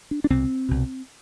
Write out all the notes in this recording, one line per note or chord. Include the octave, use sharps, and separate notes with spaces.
D4
D4
C2 B2 C4
C2 B2